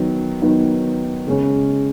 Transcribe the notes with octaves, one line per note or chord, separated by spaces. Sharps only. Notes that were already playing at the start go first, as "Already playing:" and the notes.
Already playing: D#3 F#3 B3 D#4
D#3 F#3 B3 D#4
C#3 G#3 C#4